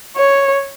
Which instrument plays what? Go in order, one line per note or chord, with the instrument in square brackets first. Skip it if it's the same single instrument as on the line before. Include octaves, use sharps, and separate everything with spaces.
[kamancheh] C#5